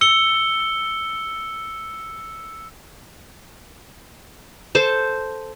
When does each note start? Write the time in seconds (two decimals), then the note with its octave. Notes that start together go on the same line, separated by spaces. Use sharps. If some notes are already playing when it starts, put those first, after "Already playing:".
0.01 E6 C#7 G7
4.75 A4 C5 A5